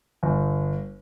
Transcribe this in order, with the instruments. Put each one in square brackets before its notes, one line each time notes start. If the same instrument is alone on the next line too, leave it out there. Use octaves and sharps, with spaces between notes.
[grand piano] G1